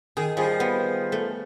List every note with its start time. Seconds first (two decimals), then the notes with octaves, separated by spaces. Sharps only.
0.17 D#3 G#4
0.37 F3 G3 G#4
0.60 B3
1.12 A3